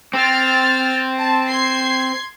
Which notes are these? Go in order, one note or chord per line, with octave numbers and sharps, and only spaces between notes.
C4 G5 F6 A6
A5
C6 G#6 C7